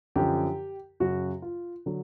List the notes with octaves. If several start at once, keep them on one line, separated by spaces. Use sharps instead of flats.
F#2 D3 F3 G4
F#2 C#3 F#3 F#4
F4
D3 F#3